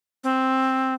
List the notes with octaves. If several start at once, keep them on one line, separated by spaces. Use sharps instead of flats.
C4